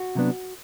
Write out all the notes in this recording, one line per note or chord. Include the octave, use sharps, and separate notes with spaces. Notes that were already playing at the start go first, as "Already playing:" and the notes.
Already playing: F#4
C3 F#3 B3 D4